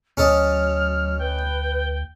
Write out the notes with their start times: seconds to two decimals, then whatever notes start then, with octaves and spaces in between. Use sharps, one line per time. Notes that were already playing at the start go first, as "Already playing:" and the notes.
0.17 D2 F#3 C#4 A4 D#5 F6
1.19 B4 G5